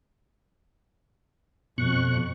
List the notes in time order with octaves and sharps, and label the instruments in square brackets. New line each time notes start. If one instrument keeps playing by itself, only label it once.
[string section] F2 [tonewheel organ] B2 C#6 F#6